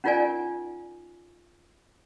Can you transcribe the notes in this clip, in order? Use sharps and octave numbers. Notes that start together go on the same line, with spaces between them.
C#4 D#4 F4 A#4 D5 G#5